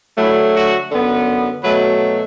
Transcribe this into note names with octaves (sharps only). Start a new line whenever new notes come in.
D3 F#3 A3 E4
F#4
F#2 D3 B3
B2 F#3 A3 B4